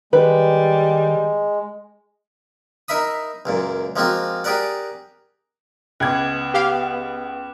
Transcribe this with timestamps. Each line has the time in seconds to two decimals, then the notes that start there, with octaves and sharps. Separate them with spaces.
0.13 D#3 G3 G#3 B4
2.88 D#4 A#4 E5 B5 D#6
3.46 C#2 F#2 A#2
3.96 F3 G#3 A#3 C4 F4 F#4
4.44 G4 G#4 A#4 D5 F#5
6.00 C#2 B3 D6 F#6 G#6
6.54 G4 F5